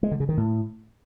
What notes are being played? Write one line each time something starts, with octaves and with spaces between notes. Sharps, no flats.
G#3
D3
C#3
D#3
A2